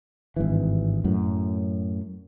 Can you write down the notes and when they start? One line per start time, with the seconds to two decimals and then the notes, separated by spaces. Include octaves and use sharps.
0.36 G#1 G2 E3
1.04 F#2 A2 F#3